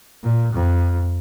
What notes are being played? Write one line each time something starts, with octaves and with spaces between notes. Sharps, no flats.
A#2
F2